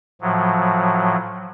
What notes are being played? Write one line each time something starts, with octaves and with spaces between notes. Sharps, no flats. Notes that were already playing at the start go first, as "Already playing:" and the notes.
A2 F3 F#3